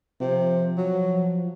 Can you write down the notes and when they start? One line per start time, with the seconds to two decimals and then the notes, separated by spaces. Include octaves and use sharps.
0.21 C3 F3
0.77 F#3